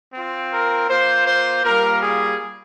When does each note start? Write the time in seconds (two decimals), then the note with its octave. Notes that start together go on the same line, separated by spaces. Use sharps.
0.14 C4 F4
0.51 A#4
0.89 A#3 F4 C5
1.27 C5
1.64 G3 A#3 F4 A#4
2.02 G#4